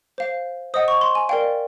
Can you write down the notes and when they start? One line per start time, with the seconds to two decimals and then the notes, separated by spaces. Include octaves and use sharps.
0.18 C5 F5
0.74 C5 D#5 F#5 D#6
0.88 C#6
1.01 C6
1.15 G#5
1.29 A#4 D5 F5 G5